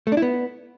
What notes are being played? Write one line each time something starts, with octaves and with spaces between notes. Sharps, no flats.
A3
D4
E4
B3